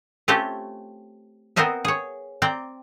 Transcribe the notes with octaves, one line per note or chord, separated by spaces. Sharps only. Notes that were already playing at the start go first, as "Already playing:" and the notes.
A3 C4 C#4 F4 G4 A4
B3 C4 A#4 C5 D#5 E5
G#4 C#5
C4 D5 G5 A#5